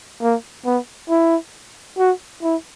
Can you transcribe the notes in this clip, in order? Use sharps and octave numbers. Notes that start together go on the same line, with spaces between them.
A#3
B3
E4
F#4
E4